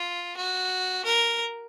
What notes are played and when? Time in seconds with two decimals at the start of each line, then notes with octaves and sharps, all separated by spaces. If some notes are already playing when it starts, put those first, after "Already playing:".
Already playing: F4
0.37 F#4
1.05 A#4